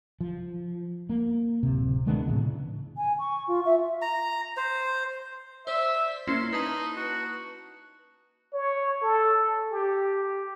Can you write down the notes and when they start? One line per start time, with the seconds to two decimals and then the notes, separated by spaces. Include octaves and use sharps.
0.21 F3
1.09 A#3
1.63 D1 C3
2.07 D#3 G#3 B3 D4
2.28 A2 C#3 E3
2.97 G#5
3.19 C#6
3.48 F4
3.65 E5
4.02 A#5
4.57 C5
5.67 C5 D5 E5 E6
6.27 A#3 C#4 E4 C6
6.53 D#4 B4 A5
6.97 F#4
8.53 C#5
9.03 A4
9.71 G4